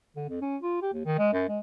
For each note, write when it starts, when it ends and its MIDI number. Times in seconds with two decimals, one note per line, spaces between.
0.16 0.25 50
0.29 0.40 41
0.41 0.57 61
0.62 0.80 65
0.82 0.93 67
0.93 1.05 39
1.05 1.18 51
1.18 1.30 56
1.33 1.46 42
1.49 1.59 56